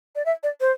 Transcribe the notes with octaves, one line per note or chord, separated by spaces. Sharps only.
D5
E5
D5
C5